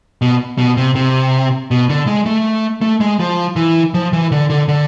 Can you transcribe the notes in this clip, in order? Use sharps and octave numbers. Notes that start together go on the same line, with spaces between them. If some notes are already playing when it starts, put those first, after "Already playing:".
B2
B2
C3
C3
B2
D3
G#3
A3
A3
G#3
F3
E3
F3
E3
D3
D3
D3